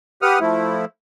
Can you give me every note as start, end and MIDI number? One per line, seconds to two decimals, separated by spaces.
0.22 0.39 67
0.22 0.39 71
0.22 0.39 78
0.22 0.39 87
0.22 0.39 89
0.40 0.85 53
0.40 0.85 57
0.40 0.85 64